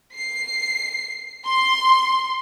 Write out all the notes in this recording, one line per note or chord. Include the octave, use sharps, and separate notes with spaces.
C7
C6